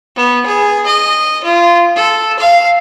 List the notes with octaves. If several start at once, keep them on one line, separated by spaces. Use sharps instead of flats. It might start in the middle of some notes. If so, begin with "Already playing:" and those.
B3
G#4
D#5
F4
A4
F5